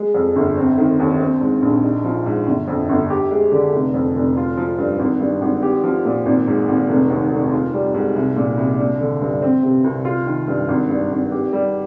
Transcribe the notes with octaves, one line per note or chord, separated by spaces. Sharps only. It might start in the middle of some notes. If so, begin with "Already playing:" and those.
Already playing: G#3
F2
G1
C4
D#3
D#2
C4
G#2
A#1
D#4
F3
G#2
G1
F2
G1
G4
G#3
D3
F1
F2
F1
F4
F3
G2
G#1
G2
G#1
G4
F3
A#2
G#1
G#2
G#1
F1
D#2
F1
F4
G3
G#2
C2
A#2
C2
D4
D3
G2
C4
C3
C2
F4
D#3
G2
G#1
G2
G#1
G4
G3